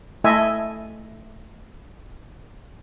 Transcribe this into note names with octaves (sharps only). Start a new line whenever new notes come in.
A3 E4 A4 D#5 E5 G#5